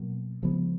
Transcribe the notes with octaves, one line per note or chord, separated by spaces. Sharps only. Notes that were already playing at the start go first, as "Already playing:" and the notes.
Already playing: B2 F#3 A#3
C#3 F3 G#3 B3